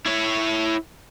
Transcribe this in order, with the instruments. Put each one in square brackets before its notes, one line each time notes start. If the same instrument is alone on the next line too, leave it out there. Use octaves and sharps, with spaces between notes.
[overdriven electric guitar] E4 C#5